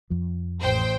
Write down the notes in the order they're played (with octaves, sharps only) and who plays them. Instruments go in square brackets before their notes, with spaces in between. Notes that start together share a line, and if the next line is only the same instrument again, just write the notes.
[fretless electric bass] F2 F3
[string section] A1 C5 G5